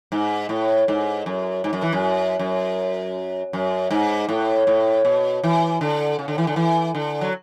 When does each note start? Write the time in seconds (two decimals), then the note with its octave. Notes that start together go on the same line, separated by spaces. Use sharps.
0.12 G#2
0.49 A2
0.88 G#2
1.26 F#2
1.64 G#2
1.73 F#2
1.82 E3
1.92 F#2
2.39 F#2
3.53 F#2
3.91 G#2
4.29 A2
4.67 A2
5.05 B2
5.44 E3
5.81 D3
6.19 C#3
6.28 D3
6.38 E3
6.47 D3
6.56 E3
6.95 D3
7.21 F#3